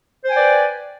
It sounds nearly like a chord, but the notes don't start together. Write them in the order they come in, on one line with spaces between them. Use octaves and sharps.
C5 G#5 G5 D5 B4